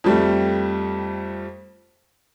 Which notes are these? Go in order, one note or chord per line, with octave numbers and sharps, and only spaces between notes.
F2 G3 A3